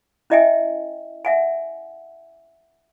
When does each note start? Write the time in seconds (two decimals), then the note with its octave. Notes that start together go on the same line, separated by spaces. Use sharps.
0.30 C#4 E4 D#5 E5 G5 G#5
1.25 E5 F#5 G#5